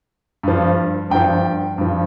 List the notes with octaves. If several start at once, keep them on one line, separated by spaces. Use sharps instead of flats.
G2 F3
G2 F3 G5
G2 F3